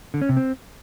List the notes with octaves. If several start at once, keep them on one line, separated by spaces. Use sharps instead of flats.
D3
C#4
C3
C4